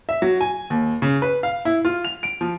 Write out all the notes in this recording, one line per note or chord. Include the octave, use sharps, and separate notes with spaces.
E5
F#3
G#5
D#2
C#3
B4
F5
E4
F4
F7
D7
F3